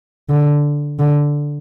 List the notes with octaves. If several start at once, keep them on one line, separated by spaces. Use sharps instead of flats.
D3
D3